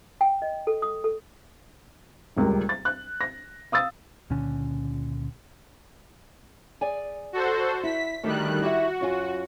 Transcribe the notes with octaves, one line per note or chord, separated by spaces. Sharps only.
G5
D#5
A4
D#6
A4
D#1 C#2 G3 A#4
A6
F#6
A#6
F5 D#6 E6 A6
C#2 A#2 D3 C#4
G#4 D5 G#5
F#4 A4 C5
E4 B6
D3 D#3 G3 A3 F#4 F#6
E4 F#4 G4 E5
F#2 F4 G#5